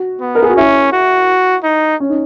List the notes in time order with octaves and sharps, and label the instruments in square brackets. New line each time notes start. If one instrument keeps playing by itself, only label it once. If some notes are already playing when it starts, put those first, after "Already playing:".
Already playing: [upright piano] F#4
[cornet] B3
[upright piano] A#4
G#4
F#4
[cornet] C#4 [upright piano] E4
[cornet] F#4
D#4
[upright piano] C#4
D#4